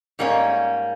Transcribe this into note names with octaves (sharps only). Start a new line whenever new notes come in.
G#2 G3 A#3 C#4